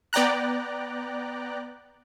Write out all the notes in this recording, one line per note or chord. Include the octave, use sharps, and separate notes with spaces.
B3 D5 G5 A#5 F#6